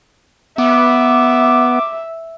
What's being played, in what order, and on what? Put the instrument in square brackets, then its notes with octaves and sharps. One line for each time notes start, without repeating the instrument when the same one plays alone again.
[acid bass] B3 [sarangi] E5 [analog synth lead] D6